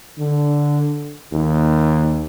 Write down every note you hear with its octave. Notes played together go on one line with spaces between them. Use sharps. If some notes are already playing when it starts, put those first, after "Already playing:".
D3
D#2